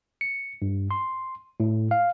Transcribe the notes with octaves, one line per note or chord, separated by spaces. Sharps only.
C#7
G2
C6
A2
F5